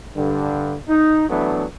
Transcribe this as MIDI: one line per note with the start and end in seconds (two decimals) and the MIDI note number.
0.16 0.75 43
0.16 0.75 50
0.89 1.27 63
1.29 1.65 52
1.29 1.65 54
1.29 1.65 57
1.29 1.65 59
1.29 1.65 62